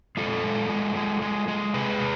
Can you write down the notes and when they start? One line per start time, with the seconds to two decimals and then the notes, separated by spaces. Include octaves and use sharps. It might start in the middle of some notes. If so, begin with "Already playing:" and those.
0.17 G#3 F4 A4
0.44 G#3
0.70 G#3
0.96 G#3
1.22 G#3
1.48 G#3
1.74 C3 G#4 B4